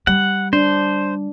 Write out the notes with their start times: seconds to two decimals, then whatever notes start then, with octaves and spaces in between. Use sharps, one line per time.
0.07 G3 F#5
0.53 D4 C5